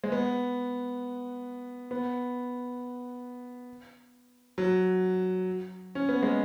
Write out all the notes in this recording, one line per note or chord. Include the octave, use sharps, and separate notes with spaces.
G#3
B3
B3
F#3
C#4
B3
G#3